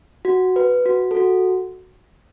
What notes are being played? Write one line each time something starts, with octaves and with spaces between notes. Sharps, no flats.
F#4
B4
F#4
A4
F#4